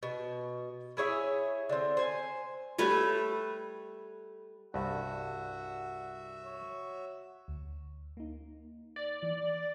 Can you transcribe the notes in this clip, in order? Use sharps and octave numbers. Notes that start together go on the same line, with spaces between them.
B2
E4 G#4 C#5 E5
D3 C4
C5 G#5
G3 A3 B4 C#5
C2 G2 F#4 E5 F#5
C#5
D2
A#3 D#4
D5
E3